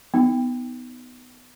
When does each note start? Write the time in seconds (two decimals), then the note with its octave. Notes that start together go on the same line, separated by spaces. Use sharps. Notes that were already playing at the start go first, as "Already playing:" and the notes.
0.14 B3 D#4